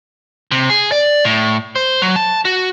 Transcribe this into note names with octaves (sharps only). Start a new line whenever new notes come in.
C3
G#4
D5
A2
C5
F#3
A5
F#4